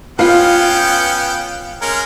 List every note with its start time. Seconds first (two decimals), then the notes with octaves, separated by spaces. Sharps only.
0.19 B3 C#4 F4 B4 F5 G5
1.82 G#3 C#4 A#4